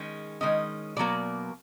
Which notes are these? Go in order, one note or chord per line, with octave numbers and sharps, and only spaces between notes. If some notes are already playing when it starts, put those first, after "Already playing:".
Already playing: D#3 G#3 C#4
D#3 G#3 C#4 D#5
B2 F#3 A#3 D5